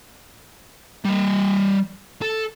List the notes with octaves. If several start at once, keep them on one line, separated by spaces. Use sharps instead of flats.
G3 D#5
A4